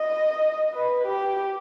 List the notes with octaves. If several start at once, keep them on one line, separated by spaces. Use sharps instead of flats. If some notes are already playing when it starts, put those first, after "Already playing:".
Already playing: D#5
B4
G4